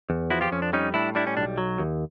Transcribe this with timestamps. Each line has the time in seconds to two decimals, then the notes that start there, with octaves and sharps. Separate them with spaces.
0.10 E2
0.30 F3 E4 F#4
0.41 F4 G4
0.52 F2 C#4
0.62 D4
0.73 G3 C#4 D#4
0.94 A2 D4 E4
1.15 G3 D4 E4
1.27 C#4
1.37 B1 D4
1.58 F#3
1.79 D#2